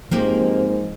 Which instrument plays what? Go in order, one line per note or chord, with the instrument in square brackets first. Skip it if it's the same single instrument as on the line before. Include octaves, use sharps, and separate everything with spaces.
[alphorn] G#2 [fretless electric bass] F3 [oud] A#3 C4 G4